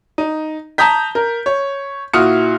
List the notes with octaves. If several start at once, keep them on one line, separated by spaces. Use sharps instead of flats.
D#4
A5 A#5 D#6 G6 B6
A#4
C#5
A#2 E4 F#4 D#6 F6 C#7